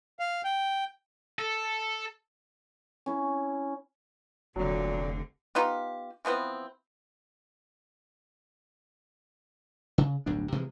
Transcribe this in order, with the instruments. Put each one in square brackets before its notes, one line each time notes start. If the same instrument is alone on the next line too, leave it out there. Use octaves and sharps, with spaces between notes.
[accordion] F5
G5
[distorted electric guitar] A4
[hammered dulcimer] C#4 E4
[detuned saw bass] F1 [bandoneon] A#2 [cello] D3 C4 [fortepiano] F#3
[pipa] B3 D#4 F4 G4
E3 F3 B3 C4
[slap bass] C#3
D1 B1 G2 D4
C3 E3 F3 G#3